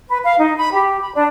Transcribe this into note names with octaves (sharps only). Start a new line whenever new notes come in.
B4
F5
D#4
B5
G4
B5
D4